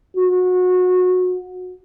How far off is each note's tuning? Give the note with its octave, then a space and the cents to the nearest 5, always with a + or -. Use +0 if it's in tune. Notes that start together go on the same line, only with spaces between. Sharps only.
F#4 -25